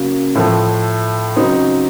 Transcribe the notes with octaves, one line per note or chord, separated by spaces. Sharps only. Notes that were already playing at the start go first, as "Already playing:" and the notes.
Already playing: C#3 F#3 A#3
A2 F3 A3
C#3 F#3 C4 D#4